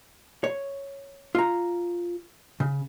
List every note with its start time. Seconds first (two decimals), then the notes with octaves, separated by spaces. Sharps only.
0.44 C#5
1.35 F4 A#5
2.60 C#3